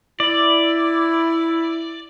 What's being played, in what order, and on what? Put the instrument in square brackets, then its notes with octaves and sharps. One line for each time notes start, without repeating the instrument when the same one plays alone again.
[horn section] E4 [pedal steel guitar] D5